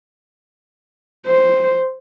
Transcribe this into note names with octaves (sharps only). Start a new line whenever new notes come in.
C5